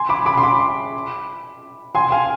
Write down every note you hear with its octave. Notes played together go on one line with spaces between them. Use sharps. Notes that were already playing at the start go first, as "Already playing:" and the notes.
Already playing: G#5 C6
B5 D6
B5 D6
C6
B5 D6
G#5 C6
F5 G#5